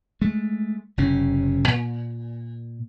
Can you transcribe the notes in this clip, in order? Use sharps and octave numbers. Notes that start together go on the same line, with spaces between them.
G#3 A3
F#1 C3 C#4
A#2